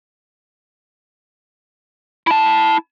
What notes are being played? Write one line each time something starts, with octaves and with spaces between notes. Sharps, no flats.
E4 A5